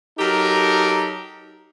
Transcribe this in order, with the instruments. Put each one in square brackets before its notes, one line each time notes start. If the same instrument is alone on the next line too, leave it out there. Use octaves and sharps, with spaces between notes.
[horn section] F#3 D#4 G4 A4 A#4